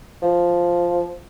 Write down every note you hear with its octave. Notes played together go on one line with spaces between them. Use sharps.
F3